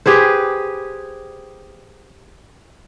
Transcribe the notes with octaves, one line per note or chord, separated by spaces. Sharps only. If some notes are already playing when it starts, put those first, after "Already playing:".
G4 G#4 B4 C5